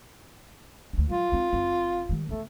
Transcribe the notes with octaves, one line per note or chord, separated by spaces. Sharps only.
D2 D4
F#3 F4
C4 D#4
F#1 C4
D#3 G3
C#3 A3 B3